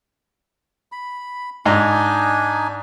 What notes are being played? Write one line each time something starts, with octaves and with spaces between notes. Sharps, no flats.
B5
G#2 D4 D#4 D#5 G#5 A#5